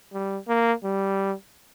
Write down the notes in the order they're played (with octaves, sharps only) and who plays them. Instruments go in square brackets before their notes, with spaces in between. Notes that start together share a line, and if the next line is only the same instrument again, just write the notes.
[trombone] G3
A#3
G3